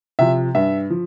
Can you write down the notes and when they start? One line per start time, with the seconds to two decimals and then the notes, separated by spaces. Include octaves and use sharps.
0.19 C3 F3 E5
0.55 G2 E5
0.90 F3